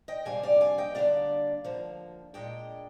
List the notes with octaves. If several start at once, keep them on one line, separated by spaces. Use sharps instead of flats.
D#5 G5
F2 C3 G3 A#3 D4 F5 G#5
D5 F5
F5 G#5
D#5 G5
D3 G3 A#3 D4 F4 D5 F5
D3 F3 A#3
A#2 G#3 D4 D#5 G5